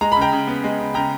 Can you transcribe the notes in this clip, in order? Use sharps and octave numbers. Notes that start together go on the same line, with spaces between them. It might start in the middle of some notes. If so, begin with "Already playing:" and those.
G#3 A#5
C#3 B5
G5 A#5
C#3
B3
G#3
C#3
C#3 G5 A#5